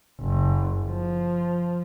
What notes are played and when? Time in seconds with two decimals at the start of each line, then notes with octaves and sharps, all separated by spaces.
0.21 F#1
0.87 F3